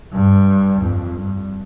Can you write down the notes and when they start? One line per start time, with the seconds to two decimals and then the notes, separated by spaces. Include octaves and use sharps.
0.13 G2
0.82 F2
1.16 G2